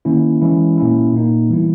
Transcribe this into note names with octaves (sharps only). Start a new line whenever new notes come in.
D#3 A#3 C#4 E4
E3 G#3 C#4 E4
A#2 A#3 C#4 E4
A#2 A#3 D#4
E3 G3 B3 E4